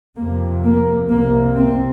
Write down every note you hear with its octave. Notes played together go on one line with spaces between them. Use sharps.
F2 C3 A#3
A#3
C2 C3 A#3
C4